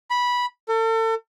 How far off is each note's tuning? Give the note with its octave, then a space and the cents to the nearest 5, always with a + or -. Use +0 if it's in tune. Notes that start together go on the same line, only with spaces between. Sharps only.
B5 -10
A4 +40